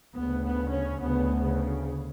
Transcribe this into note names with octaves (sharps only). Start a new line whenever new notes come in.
D2 C#3 B3
B3
C#4
D2 C#3 B3
C#3